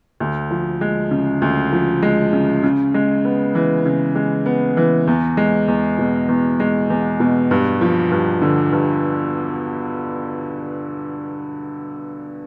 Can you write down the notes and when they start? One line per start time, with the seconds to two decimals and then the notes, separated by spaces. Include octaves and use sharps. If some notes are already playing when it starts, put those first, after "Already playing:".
0.20 D2
0.51 F3
0.81 G#3
1.11 C#3
1.42 D2
1.73 F3
2.02 G#3
2.33 C#3
2.63 C#3
2.94 G#3
3.25 B3
3.55 E3
3.85 C#3
4.15 G#3
4.46 B3
4.77 E3
5.07 E2
5.37 G#3
5.68 E2
5.98 B2
6.29 E2
6.60 G#3
6.90 E2
7.20 B2
7.51 G2
7.81 F3
8.11 G2
8.42 D3
8.72 G2